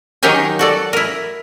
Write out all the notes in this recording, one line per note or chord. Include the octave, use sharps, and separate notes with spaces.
D#3 F#3 D#4 G4 A#4 G#5
F#4 A4 D5
E4 A#4